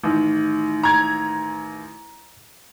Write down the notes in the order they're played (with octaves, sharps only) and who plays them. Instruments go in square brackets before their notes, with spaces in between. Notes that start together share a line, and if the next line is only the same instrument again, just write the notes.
[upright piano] A1 D#3
[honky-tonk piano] A#5 G#6